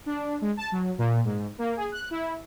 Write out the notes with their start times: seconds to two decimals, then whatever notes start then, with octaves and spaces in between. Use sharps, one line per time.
0.06 D4
0.41 G#3
0.57 A5
0.72 F#3
0.98 A#2
1.25 G#2
1.58 A#3
1.77 G#4
1.92 F#6
2.11 E4